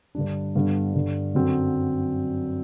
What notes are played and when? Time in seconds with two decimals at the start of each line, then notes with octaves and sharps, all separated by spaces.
0.15 G2 D3 G3 D4
0.55 G2 D3 G3 B3 D4
0.94 G2 D3 G3
1.35 F#2 D3 F#3 C4